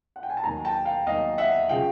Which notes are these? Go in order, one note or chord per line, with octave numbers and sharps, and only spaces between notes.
F#5
G5
G#5
A5
D#2 D#3 F#3 G#5 A#5
G5 A5
F5 G5
D#2 D#3 F#3 D#5 F5
E5 F#5
C#3 F3 F5 G5